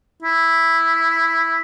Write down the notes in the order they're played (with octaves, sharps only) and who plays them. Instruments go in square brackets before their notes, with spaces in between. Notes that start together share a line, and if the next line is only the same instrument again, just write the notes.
[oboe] E4